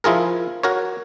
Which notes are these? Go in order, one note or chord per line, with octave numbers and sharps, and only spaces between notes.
F3 E4 F4 G#4 A#4
F#4 A#4 C#5